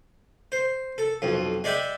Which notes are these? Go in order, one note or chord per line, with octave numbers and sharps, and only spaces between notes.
C5
A4
B1 F2
G#3 D5 E5 G5 D6